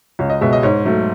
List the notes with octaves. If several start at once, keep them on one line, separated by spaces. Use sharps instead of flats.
C#2 C#5
D#5
B2 G#3 E5
D#5
G#2 C#5
F#3 A3